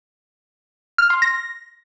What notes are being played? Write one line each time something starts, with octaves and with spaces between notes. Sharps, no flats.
F6
C6
A#6